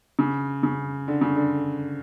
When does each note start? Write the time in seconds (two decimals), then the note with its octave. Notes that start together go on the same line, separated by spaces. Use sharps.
0.19 C#3
0.63 C#3
1.08 D3
1.21 C#3
1.36 D3